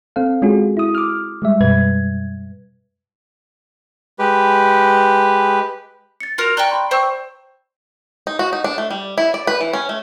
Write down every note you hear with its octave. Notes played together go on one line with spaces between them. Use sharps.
C4 A4 F5
G#3 C#4 F4 F#4 G#4
E4 D#6
D6 F6
G3 G#3 E5
F#2 B2 G3 B4 G#6
G#3 G4 B4
A6 C#7
F4 F#4 A#4 C#7 F7
D5 G5 A#5 C#6 F#6 G7
B5 C6
C5 G5 C#6 E6
D#4
F#4
D#4
D4
A3
G3
E4
D5
B4
E3
C#4
A3